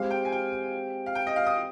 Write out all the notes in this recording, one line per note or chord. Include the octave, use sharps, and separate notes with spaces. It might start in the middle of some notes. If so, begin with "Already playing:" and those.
Already playing: G#3 C4 G4 F5
G5
G#5
G5
F5
G5
D#5
F5
D#6